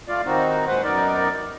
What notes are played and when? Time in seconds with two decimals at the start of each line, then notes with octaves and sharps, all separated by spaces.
0.08 A3 F4 D5 F5
0.25 D#3 C4 D#4 F#4
0.67 A#2 G#3 B4 C5 F#5
0.83 F#2 B3 D#4 A#4 D5